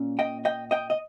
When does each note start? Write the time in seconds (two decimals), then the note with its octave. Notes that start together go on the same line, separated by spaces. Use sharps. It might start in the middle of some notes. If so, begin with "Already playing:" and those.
Already playing: A#2 A#3 C#4
0.19 D#5 G5
0.45 D#5 G5
0.71 D#5 G5
0.90 D#5